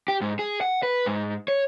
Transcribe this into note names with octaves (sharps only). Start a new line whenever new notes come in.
G4
G#2
G#4
F#5
B4
G#2
C#5